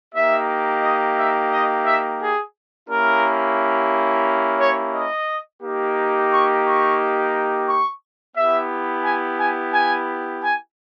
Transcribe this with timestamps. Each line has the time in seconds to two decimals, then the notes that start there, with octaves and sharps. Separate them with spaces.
0.14 A#3 D#4 G4 E5
0.83 D#5
1.17 E5
1.52 D#5
1.86 E5
2.20 G#4
2.88 A#3 C#4 E4 G4 A#4
4.60 C#5
4.94 D#5
5.62 A#3 D#4 G4
6.30 C#6
6.65 C#6
7.68 C#6
8.36 B3 E4 G4 E5
9.04 G#5
9.38 G#5
9.73 G#5
10.42 G#5